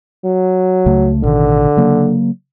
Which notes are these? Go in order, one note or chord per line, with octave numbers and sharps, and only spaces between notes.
F#3
C#2 C#3 A3
A1 B2 D3 D#3
C#3 F#3 A#3